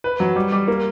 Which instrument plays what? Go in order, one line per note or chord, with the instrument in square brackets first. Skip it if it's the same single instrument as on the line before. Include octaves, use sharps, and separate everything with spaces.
[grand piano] B4
F#3
G3
G3
A#3